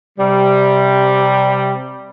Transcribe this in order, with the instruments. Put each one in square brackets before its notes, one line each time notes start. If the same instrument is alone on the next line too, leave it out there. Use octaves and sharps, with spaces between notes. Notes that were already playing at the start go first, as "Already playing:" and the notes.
[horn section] C3 G3